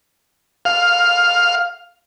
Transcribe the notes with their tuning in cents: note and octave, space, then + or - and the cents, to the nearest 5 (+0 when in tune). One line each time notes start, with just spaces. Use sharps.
F5 +5